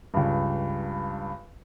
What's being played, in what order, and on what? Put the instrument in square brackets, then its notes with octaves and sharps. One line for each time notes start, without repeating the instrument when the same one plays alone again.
[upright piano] C#2 G2